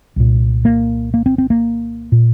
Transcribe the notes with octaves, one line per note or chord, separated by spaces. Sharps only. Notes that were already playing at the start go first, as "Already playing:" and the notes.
C2 A#2
A#3
A#3
C4
C4
A#3
A#2